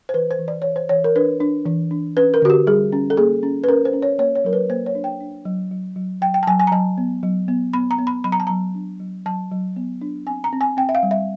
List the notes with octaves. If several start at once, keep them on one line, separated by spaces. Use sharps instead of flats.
C5
E3 B4
C5
E3
D5
E3 C#5
C5
E3 C#5
A#4
D4 B4
D4
E3
D4
C#4 B4
A#4
D3 F#4
G4
G3 G#4
C#4
A4
A#3 G#4
C#4
B4
C#4 A#4
C5
C#4
C#5
A#3 C#5
C#5
F#3 A#4
B4
A#3 C5
C#5
D4
G5
D4
F#3
F#3
F#3
F#3 G5
G5
A5
F#3 G#5
G#5
A#5
F#3 A5
B3
F#3
B3
B3 B5
A#5
B3
B5
F#3 B5
A#5
A5
F#3 A#5
D4
F#3
F#3 A5
F#3
B3
D4
C4 G#5
A#5
C4
G#5
C4 G5
E5
F5
G3
E5